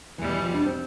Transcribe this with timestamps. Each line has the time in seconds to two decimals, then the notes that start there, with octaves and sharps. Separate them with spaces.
0.18 E2 B2 E3 G3
0.30 E3
0.42 F3
0.54 D4
0.66 C4